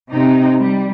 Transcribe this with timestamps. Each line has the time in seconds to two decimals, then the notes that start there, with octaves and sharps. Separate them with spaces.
0.12 C3 D#4
0.60 G3